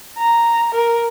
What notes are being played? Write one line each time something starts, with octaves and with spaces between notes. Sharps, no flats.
A#5
A#4